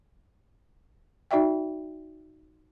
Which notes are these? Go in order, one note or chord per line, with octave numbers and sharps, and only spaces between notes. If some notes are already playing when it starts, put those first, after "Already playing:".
D#4 F#4 D5 E5 G5